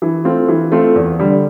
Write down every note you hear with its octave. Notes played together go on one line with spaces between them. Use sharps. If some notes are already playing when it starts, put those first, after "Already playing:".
E3
A3 C4 F4
E3
A3 C4 F4
E2
D3 G3